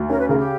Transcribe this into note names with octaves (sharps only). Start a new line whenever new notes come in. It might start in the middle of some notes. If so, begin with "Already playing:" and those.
Already playing: D2
C#4 A#4 C#5
B4
C#3 A#4
G4